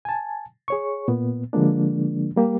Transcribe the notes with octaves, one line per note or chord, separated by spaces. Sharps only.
G#5 A5
G#4 C#5 C#6
A#2 B3
D3 F3 G#3 A#3 D4
G3 A#3 G4